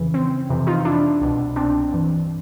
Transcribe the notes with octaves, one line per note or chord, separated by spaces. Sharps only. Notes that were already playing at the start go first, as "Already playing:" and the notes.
Already playing: F2 C#3 E3
C4
F2 C3 E3
D#4 F4
D4 E4
C2 B2
C4 D4
G2 E3